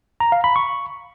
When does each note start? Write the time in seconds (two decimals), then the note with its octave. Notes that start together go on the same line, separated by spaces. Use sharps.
0.20 A#5
0.32 F5
0.44 B5
0.56 C#6